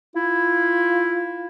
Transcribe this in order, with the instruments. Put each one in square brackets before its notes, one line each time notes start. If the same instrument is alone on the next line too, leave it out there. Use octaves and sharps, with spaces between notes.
[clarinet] E4 [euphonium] F4